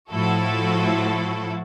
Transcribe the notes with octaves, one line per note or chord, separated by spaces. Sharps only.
A2 F3 E4 F#4 A4